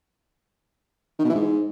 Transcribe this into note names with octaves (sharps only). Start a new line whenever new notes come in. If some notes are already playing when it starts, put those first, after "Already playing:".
D#3
B2
E3
G#2